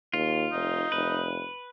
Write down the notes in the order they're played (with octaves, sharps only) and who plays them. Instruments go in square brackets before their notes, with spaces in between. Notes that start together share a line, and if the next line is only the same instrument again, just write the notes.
[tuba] D#2 [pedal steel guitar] F4
[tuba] F1 [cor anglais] D#4
[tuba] F1 [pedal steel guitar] B4